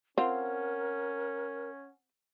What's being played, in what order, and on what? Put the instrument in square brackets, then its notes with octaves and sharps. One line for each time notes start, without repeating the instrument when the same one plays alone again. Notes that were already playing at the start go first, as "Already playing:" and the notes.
[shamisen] C4 F4 [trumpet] C#4 [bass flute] A#4 [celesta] F#5